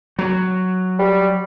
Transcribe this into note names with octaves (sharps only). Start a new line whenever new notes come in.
F#3
G3